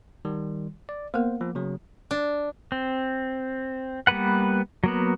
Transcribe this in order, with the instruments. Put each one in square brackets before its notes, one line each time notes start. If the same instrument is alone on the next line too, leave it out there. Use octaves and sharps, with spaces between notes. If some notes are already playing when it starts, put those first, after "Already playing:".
[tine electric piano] D#3 G3
D5
[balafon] A#3 B3 A#4 [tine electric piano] C5
[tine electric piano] F3
C#3 F#3
[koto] D4
[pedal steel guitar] C4
G3 A#3 B3 B4 F#5
F#3 A#3 B3